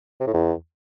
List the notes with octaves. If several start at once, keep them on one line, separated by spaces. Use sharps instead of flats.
C3
A2
E2